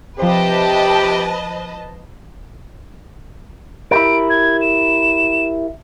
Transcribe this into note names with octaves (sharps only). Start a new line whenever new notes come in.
C3 F3 G4 B4 C5 D#5 A5
E4 G4 A#4 D7
G#6
E7